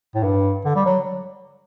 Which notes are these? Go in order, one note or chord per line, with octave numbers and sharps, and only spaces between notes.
A2
G2
D3
G3
F#3